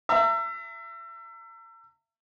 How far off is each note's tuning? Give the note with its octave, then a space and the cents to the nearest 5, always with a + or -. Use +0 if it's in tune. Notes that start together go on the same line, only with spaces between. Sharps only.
E5 +30 A#5 -35